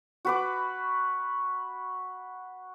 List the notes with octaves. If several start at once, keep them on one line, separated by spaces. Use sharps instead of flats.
F#4 B4 D6